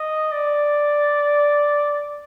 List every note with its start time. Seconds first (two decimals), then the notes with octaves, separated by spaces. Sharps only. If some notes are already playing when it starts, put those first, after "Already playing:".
Already playing: D#5
0.32 D5